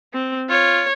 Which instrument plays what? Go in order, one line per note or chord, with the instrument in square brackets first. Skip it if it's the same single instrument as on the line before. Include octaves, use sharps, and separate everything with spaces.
[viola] C4
[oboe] F4 [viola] C#5